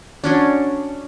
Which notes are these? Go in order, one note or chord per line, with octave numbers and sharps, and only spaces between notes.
F#3 C#4 D4